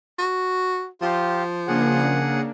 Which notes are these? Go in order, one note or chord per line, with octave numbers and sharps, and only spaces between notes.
F#4
F3 F4 G4
C#3 A#3 D4 G#4 F#5